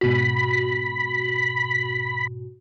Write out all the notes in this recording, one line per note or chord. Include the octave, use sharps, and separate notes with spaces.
G#2 B2 F#4 B5